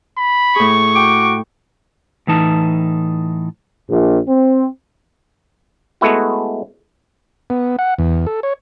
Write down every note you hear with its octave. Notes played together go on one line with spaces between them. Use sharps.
B5
A2 G#4 C#6
F#4 G5 D6
A2 E3 D#4 A5
A#1
C4
G#3 A3 B3 E4 F#4
B3
F#5
E2
A4
C#5